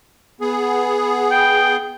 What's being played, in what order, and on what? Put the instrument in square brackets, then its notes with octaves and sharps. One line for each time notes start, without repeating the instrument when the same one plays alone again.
[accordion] B3 G#4
[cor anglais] G5